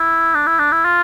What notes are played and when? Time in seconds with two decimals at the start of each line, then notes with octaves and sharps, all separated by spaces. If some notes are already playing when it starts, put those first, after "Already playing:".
Already playing: E4
0.35 D4
0.47 E4
0.59 D4
0.72 E4
0.85 F4